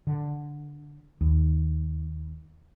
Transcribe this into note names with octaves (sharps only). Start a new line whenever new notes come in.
D3
D#2